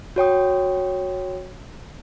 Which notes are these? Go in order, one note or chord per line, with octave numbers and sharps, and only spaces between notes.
F#4 C#5 G5 D#6